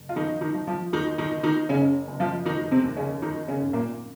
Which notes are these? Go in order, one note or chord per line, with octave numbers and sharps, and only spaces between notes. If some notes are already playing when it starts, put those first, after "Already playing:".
Already playing: F#1
F4
D#3 F3 D#4
D#3 D#4
F3
F3 F4
D#2 D#3 D#4
D#3 D#4
D#3
D#3 D#4
F#1 C#3 C#4
F#1
F3 F4
F1 D#3 D#4
C3 C4
D#2
C#3 C#4
F#2 D#3 D#4
C#3 C#4
G#1
A#2 A#3